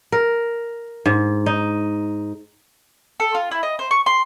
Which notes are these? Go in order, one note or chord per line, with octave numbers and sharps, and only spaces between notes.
A#4
G#2
D#4
A4
F4
E4
D#5
C5
C#6
C6